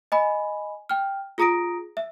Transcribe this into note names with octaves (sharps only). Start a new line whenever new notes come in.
D#5 G#5 B5
G5 F6
F4 G#4 A#5 D#6 A#6 D7
E5